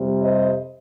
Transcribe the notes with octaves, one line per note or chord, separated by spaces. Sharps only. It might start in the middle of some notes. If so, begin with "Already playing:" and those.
Already playing: F2 C3 G3
C5 D#5